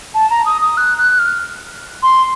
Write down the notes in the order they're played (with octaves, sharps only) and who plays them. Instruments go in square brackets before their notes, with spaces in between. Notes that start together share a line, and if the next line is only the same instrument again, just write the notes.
[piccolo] A5
A#5
D#6
D#6
F#6
F#6
F6
C6